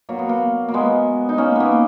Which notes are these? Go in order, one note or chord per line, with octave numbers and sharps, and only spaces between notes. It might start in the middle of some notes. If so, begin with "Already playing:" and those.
B2 F#3 A#3
B3
A#3
A#3
G#3 B3
D#4
A#3 C#4
A#3 B3